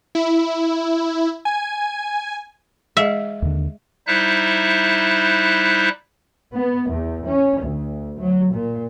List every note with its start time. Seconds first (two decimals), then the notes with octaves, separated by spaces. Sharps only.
0.15 E4
1.45 G#5
2.97 G#3 G#4 D#5 E5
3.42 D#2 D3
4.07 G3 D#4 E4 C5 E5 F#6
6.55 B3
6.90 E2
7.26 C#4
7.63 D2
8.19 F#3
8.52 A#2